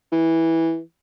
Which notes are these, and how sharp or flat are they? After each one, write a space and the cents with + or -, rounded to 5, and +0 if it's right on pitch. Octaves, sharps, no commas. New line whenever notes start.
E3 -10